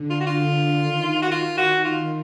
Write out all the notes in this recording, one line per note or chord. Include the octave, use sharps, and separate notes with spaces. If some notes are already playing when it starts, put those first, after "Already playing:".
Already playing: D3
F4
F#4
F4
D#3
F#4
D#3 F4
F#4
F4